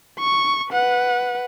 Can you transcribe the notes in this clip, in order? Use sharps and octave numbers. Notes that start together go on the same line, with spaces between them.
C#6
B4 F#5